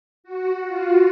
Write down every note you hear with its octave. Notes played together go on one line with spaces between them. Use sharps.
F#4
F4